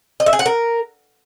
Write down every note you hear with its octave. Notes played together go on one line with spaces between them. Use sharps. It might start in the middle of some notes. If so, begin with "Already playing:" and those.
D#5
E5
G#4
F#5
A#4